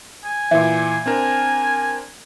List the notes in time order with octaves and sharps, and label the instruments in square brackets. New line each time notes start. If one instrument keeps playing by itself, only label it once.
[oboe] G#5
[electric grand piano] A#2 E3 [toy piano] E5
[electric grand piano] C4 D4 A#4 [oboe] G#5